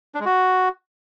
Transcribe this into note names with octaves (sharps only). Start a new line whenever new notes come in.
D4
G#3
F#4